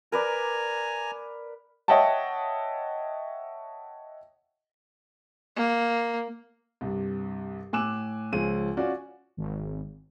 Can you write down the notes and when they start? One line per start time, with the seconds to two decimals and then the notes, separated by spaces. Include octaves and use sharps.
0.12 A#4 B4 D5 G#5 A#5
1.88 C#5 D#5 E5 F#5 G5 A5
5.56 A#3
6.81 C2 G2
7.73 A2 G#5 D6 E6 F#6 E7
8.32 C#2 F3 G#4 D#7
8.77 C#4 F4 F#4 D5
9.37 G#1